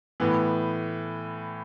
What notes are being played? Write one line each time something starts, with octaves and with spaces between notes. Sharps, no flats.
A2 E3 B3